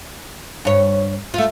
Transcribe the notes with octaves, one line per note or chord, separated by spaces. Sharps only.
G2 C#5
A3 F4